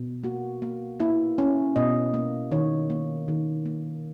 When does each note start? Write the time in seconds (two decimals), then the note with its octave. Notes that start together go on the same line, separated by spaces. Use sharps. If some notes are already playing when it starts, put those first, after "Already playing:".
Already playing: B2
0.23 A#3 F#4
0.62 A#3
1.00 A#3 E4
1.38 C#4
1.76 B2 D#5
2.14 A#3
2.52 D#3 C#5
2.90 A#3
3.28 D#3
3.66 A#3